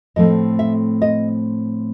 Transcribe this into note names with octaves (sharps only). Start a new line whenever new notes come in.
A2 F3 A3 C4 D#5
E5
D#5